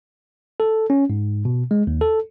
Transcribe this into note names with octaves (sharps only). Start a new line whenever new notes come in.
A4
C#4
G#2
B2
G#3
D#2
A4